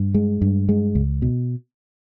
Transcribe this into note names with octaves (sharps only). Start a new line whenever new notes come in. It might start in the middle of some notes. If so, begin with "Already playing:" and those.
Already playing: G2
G#3
G2
G#3
C#2
B2